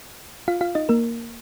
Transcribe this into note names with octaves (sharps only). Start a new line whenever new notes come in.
F4 F5
F4 F5
D#4 D#5
A#3 A#4